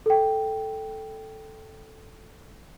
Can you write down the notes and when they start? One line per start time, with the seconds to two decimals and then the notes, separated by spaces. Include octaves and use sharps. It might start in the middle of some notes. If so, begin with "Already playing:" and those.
0.06 A4 G5